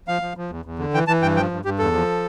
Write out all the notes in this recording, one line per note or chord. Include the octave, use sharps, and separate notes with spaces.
F3 F5
F3
F3
E2
E2
D3
E3 G5
E3 A5
G2 G5
F3 G5
G2
G2 G4
E2 A4
F3